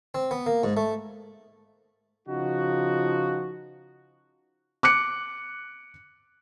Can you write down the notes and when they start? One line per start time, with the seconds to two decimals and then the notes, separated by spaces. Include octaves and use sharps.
0.15 C4
0.31 B3
0.46 A#3
0.63 G#2
0.77 A3
2.28 C#3 F3 D#4 F4 F#4
4.83 D6 F#6 C#7